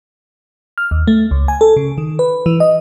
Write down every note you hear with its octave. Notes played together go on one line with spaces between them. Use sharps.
F6
D#2
A3
C#2
G#5
A4
C#3
D#3
B4
E3
D#5